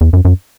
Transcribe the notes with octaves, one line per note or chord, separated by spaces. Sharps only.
E2
F#2
F#2